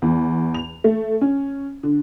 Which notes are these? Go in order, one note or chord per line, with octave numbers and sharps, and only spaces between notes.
E2
F7
A3
C#4
D3